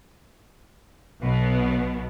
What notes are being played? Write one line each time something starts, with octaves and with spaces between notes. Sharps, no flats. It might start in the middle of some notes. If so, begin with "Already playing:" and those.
B1 B2 B3